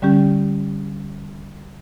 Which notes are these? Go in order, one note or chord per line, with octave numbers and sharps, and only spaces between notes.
D3 G3 C#4 G4